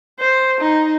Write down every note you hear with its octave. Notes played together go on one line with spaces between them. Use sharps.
C5
D#4